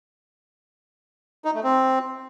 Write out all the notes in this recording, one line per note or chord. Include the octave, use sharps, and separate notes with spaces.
D#4
A3
C4